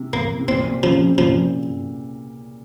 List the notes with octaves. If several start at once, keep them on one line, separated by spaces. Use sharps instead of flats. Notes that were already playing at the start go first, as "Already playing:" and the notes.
Already playing: C3
A#3
C3
A#2 C4
C3
C#3 F3
C3
A#2 F3